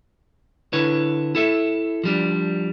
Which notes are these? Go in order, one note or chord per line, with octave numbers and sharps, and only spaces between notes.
D3 E4 B4 C#5
E4 A4 E5
F3 G3 D4